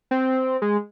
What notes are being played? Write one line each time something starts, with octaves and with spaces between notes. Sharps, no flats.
C4
G#3